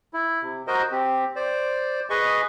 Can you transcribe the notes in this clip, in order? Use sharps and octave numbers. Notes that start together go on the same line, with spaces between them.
E4
C3
F#4 A#4 C5 D#5
C4 G4
C5 D5
G#4 B4 D#5 C#6